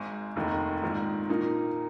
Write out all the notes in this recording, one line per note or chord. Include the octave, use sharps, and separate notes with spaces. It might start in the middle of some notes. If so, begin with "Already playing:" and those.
Already playing: G#1 G#2 G#3
F1 D#2 D#3
A#1 G#2 D#3
A#2 A#3 D#4